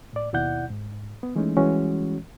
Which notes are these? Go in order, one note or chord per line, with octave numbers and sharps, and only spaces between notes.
A2 D5
D#2 B2 E4 D5 F#5 G6
G#2
B3
E3 G#3 A3 C#4 D#4
E3 G3 G#3 C#4 F#4 C#5